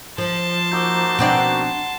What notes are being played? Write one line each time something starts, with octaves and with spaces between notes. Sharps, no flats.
F3 A5 C6
A#3 D#4 F#4 D6 E6 G6
B2 C4 D4 F#5 C7